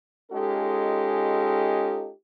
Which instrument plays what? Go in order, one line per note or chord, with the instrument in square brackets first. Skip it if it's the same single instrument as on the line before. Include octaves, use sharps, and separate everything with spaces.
[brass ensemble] G#3 C#4 D#4 F4 G4 A4